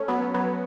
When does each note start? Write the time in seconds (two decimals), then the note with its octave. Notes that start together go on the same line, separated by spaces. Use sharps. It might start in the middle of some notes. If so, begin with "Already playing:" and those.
Already playing: A3 C#4
0.08 F#3 B3
0.34 F#3 B3